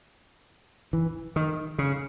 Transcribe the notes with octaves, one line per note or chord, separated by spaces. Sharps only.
E3
D#3
C#3